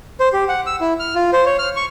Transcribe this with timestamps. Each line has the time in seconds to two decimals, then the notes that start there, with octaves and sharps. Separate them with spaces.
0.20 C5
0.33 G4
0.49 F#5
0.66 E6
0.81 E4
0.99 F6
1.15 F4
1.33 C5
1.46 C#5
1.59 F6
1.76 C#6